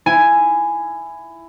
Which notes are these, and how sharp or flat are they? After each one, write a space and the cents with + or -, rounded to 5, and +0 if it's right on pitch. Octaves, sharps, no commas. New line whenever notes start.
E4 +15 G#5 +0